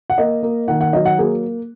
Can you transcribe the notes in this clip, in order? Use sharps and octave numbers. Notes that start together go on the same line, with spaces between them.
F#5
A#3 D#5
A#3
D#3 F#5
F#5
F#3 D#5
F#5
A#3 G#4